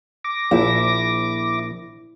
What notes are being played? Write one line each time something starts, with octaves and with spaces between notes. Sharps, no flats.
D6 A#6
A#1 A#2 E4